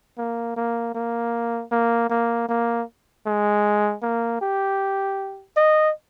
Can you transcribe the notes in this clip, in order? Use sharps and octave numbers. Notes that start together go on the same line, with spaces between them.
A#3
A#3
A#3
A#3
A#3
A#3
G#3
A#3
G4
D#5